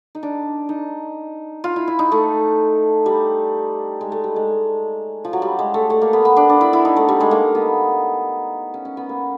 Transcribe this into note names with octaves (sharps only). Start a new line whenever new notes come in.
D#4
D4
D#4
F4
E4
E4
D#4
A3
G3
G#3
A3
G3
G#3
F3
F#3
G3
G#3
A3
A3
A#3
B3
B3
D4
D4
E4
E4
D#4
A3
G3
G#3
A#3
B3
C#4
C#4
B3
A#3